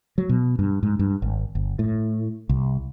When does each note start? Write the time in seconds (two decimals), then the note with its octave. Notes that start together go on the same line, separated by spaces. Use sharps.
0.18 F#3
0.29 B2
0.59 G2
0.83 G#2
0.99 G2
1.22 G#1
1.55 G1
1.79 A2
2.49 C2